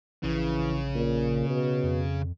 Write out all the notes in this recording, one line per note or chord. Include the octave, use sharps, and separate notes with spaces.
A#1 C#3 E3
A#2
B2
F2